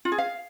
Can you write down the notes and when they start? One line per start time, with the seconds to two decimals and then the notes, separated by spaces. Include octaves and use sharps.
0.05 F4
0.12 G#4
0.18 F5